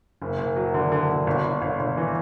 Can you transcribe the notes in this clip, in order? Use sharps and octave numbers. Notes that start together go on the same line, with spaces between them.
F#1
F#1
F#3
D3
D3
D3
G1
G1
G1
G1
E3